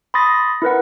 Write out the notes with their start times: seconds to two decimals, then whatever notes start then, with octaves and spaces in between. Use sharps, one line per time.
0.14 B5 C6 D#6 A6 A#6
0.62 E4 A#4 B4 F#5